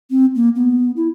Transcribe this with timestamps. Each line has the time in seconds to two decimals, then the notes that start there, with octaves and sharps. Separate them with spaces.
0.11 C4
0.35 A#3
0.56 B3
0.96 E4